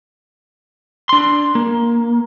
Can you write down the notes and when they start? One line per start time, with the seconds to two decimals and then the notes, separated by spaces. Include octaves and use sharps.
1.09 D4 C6
1.55 A#3